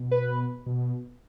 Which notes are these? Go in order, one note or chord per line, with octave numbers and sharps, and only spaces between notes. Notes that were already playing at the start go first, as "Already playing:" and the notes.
Already playing: B2
B4
B2